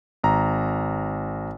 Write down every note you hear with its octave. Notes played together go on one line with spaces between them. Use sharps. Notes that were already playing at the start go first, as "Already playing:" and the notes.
G#1 A#5